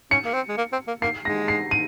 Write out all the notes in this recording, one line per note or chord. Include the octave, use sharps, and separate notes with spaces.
C#4 C#7
A#3
C4
G#3
A#3
C4
A#3
A#3 C7
G#3 A#6
C7
D#7